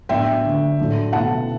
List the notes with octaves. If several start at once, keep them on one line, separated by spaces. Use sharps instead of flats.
A2 F#3 B3 D4 E5 G5
D3 A3 D4
A2 F#3 A3 D4
B2 A3 E4 F#5 A5